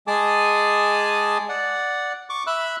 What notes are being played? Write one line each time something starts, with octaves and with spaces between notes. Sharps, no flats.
G#3 G#4 G#5 A5 D6 D#6
D5 F#5
C#6 D6
E5 B5 E6 F#6